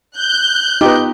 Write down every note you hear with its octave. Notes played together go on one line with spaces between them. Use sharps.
F#6 G6
B3 D#4 F4 G4